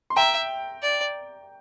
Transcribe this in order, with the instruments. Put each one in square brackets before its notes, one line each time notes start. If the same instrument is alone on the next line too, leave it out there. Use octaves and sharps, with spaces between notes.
[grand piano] C6
[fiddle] E5 [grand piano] G5 A#5
[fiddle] D5